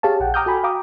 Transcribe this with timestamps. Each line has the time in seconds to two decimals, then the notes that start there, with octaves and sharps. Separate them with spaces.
0.03 G4 G#4 C#5 F5 A5
0.20 A#1 F#5 G5
0.34 G5 A#5 D6 D#6 F6 G6
0.46 F#4 A4 G5 G#5 B5
0.63 F5 G5 A#5 D6 D#6